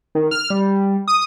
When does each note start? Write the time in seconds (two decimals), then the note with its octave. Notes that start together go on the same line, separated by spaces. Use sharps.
0.15 D#3
0.31 F6
0.50 G3
1.08 D#6